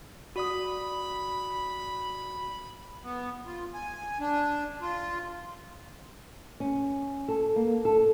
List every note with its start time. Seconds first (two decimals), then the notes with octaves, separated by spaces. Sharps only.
0.36 F#4 D5 B5 D#6
3.04 B3
3.46 F4
3.74 G#5
4.20 D4
4.82 F4
6.60 C#4
7.28 A4
7.56 A#3
7.85 A4